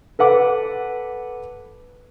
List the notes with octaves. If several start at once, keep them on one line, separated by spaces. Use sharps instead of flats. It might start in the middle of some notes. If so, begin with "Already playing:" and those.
A4 B4 F#5 D6